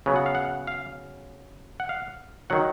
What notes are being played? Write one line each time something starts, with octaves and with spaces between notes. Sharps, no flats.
C#3 F#3 B3
F#5
F5
F#5
F5
F#5
F5
D#3 F#3 F#5